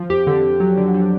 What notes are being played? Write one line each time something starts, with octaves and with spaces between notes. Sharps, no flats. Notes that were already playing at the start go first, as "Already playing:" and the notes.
Already playing: F3
F2 G4
D3
D3
F#3
D3
D3